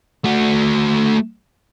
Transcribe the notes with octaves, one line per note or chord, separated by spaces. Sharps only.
A3 F#4